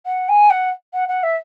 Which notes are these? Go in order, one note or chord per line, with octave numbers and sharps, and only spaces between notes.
F#5
G#5
F#5
F#5
F#5
E5